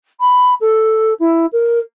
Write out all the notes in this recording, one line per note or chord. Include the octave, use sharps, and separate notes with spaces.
B5
A4
E4
A#4